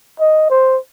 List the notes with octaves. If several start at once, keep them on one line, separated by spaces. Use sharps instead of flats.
D#5
C5